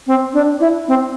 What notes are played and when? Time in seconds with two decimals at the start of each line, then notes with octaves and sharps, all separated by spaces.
0.07 C4
0.34 D4
0.60 E4
0.88 C4